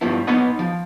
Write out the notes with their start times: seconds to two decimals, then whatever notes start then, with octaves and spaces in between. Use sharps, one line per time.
0.01 G2 B2 F3 E4
0.27 B3 D#4 B4 C#5 D#5 F#5
0.59 F3